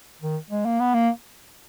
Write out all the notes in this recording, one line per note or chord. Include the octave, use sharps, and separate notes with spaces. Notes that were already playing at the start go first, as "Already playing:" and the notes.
D#3
G#3
A#3
B3
A#3